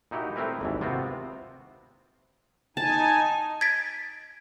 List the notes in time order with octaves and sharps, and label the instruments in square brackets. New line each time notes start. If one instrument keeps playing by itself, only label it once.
[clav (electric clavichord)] A#2 D#4 E4 F#4 G4
A3 C4 E4 A#4 B4
G#1 D#2 E3
C3 B3 C4 F4 F#4
[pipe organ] D#4 G#5 [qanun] A5
[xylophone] G#6 A6 B6 D7